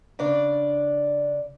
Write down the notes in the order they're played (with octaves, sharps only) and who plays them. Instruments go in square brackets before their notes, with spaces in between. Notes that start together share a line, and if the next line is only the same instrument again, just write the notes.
[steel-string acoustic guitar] C#3 D4 D5